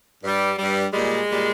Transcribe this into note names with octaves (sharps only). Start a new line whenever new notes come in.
G2 G3
G2 G3
A#2 G3 G#3
A#2 G3